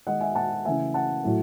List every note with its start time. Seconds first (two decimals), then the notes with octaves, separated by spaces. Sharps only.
0.06 D#3 G#3 D#5 F#5
0.21 E5 G#5
0.35 F#5 A5
0.65 C#3 E3 A3 E5 G#5
0.94 F#5 A5
1.24 A2 F#3 A3